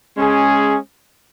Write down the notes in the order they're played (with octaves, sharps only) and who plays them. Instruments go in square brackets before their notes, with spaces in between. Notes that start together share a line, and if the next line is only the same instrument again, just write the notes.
[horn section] G#3 C#4 G#4